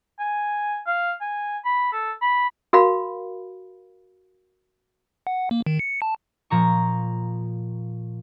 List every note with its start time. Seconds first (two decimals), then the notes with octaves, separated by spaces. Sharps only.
0.19 G#5
0.87 F5
1.21 G#5
1.65 B5
1.93 A4
2.22 B5
2.73 F#4 A#4 F5 B5
5.27 F#5
5.51 A#3
5.66 D#3
5.79 C#7
6.02 A5
6.50 A#2 F3 A#5 C#6